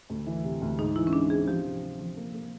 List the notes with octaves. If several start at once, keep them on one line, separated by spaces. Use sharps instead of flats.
D2
E3
C3
D2
G#2 D#4
E3 E4
C#4
G#2 D4
C4 G#4
F3 G4
C3
C3
F3
A#3
A#3